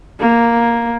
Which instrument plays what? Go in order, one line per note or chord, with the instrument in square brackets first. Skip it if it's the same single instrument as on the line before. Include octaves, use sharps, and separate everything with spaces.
[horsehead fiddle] A#3